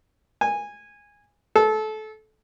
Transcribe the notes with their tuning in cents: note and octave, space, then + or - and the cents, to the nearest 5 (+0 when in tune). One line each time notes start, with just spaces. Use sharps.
G#5 -15
A4 -25